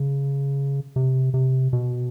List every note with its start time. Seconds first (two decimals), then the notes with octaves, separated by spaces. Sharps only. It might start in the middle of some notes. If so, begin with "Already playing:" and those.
Already playing: C#3
0.96 C3
1.34 C3
1.73 B2